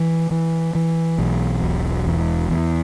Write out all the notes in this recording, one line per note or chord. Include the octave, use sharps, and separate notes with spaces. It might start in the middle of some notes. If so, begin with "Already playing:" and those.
Already playing: E3
E3
E3
B1
E1
E2
E2